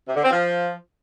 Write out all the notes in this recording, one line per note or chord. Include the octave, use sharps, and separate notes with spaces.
C3
D3
C4
F3